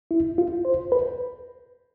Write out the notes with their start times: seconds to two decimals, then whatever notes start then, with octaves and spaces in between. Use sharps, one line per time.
0.11 E4
0.38 F4
0.65 C5
0.92 B4